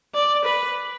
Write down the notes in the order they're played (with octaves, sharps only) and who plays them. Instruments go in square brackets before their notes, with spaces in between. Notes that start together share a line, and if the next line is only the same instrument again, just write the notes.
[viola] D5
B4